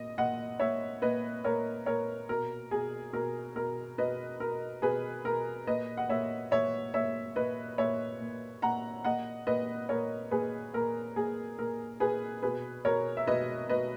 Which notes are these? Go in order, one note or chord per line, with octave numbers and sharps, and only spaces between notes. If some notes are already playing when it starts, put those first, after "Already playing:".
Already playing: A#2 D#5
A#2 D#5 F#5
A#2 C#5 E5
A#2 B4 D#5
A#2 A#4 C#5
A#2 A#4 C#5
B2 A#4
B2 G#4
B2 A#4
B2 A#4
B2 B4 D#5
B2 A#4
B2 G#4 B4
B2 A#4
A#2 B4 D#5
F#5
A#2 C#5 E5
A#2 C#5 E5
A#2 C#5 E5
A#2 B4 D#5
A#2 C#5 E5
A#2
A#2 F#5 A#5
A#2 D#5 F#5
A#2 B4 D#5
A#2 A#4 C#5
A#2 G#4 B4
A#2 A#4
A#2 G#4
A#2 A#4
A#2 G#4 B4
B2 G#4 B4
B2 A#4 C#5
E5
B2 B4 D#5
B2 B4 D#5